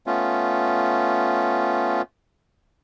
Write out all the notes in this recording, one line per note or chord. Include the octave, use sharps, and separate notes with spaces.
A3 B3 C#4 F4